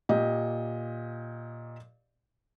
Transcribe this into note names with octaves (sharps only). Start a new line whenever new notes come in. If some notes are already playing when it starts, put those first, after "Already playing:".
A#2 G4 D#5